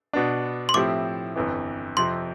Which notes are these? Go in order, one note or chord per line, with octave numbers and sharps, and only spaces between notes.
B2 B3 D4
C6
A2 F3 C4 E4 G4 D6
G1 F2 E3
F2 C3 F3 C4 C6